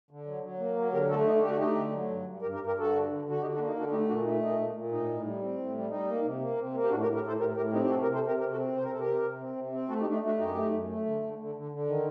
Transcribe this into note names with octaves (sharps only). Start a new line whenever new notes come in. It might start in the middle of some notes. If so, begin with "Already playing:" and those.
D3
F#3
F#3
A#3
F#3
D3 G4 A#4
A3 F#4 A4
D3 D#4
A3 G4
F#4
A3 D#4 G4
D3
F#3
G2
G2
G2 G4 A#4
G4 A#4
G2
G4 A#4
G2 F#4 A4
D3
D3
D3
F#4
D3 D#4 G4
D4 F#4
A#3
D#4
D3 D4 F#4
A3 D#4 G4
A#2 D4 F#4
A3 D#4
A#2 D#4
A#2
A#2
A2 D#4
A2
G3
C4
A2
G3
G3 D#4
A#3
C3
A#3
C3
A#3
G4
A2 D4 F#4
G4 A#4
A2
G4 A#4
A2 A4 C5
A2 G4 A#4
A2 G4 A#4
C4 D#4 G4
G4
C3 F#4 A4
G4 A#4
C3
A4 C5
C3 G4 A#4
C3 G4 A#4
F#4 A4
C4
C3 C5
A#4
C3 A4
G4 A#4
C3
C3
C4
C3
C4
A3 F#4 A4
D#4 G4
A3 D4
D#4
A3 D4 F#4
F#2 D#4 G4
A3
F#2
A3
D3
D3
D3
D3
D3
D#3